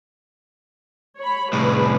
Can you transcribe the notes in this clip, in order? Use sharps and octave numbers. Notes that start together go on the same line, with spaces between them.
C#5 B5
C2 A2 G#4 B4